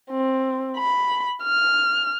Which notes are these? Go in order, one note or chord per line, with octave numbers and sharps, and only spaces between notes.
C4
B5
F6